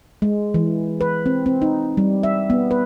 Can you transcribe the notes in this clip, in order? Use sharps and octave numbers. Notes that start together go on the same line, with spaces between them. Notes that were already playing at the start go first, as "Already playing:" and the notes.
G#3
E3
B4
C4
C4
D#4
G3
E5
B3
B4